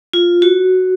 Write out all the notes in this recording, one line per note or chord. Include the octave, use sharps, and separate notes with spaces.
F4
F#4